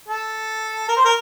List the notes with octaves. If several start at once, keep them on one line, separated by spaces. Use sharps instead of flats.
A4
A#4
C5
A#4